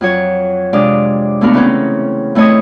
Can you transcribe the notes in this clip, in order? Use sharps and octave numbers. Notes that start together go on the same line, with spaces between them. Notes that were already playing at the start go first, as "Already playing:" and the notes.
F2 F#3 C#5
C3 G#3 D4 D5 F5 D#6
D#2 A3 B3 D4 F#4 A#4
C#3 E3 C4 C#4
E3 A3 C4 C#5 D#5 D#6